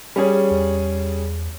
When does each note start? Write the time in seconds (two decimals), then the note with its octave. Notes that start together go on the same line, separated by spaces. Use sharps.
0.16 G3 C#4 G#4
0.51 E2